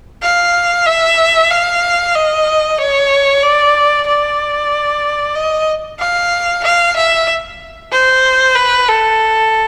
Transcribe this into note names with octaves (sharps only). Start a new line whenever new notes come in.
F5
E5
F5
D#5
C#5
D5
D5
D#5
F5
F5
E5
C5
B4
A4